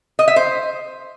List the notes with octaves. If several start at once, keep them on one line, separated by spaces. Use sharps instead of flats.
D#5
E5
C5